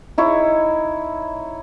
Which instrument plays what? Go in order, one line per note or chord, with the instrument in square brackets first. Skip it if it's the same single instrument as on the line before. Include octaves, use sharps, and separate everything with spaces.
[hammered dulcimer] D#4 E4 C#5